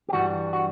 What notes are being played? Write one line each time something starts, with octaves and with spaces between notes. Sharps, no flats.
G4
G2 E3 G3 F#4
F#4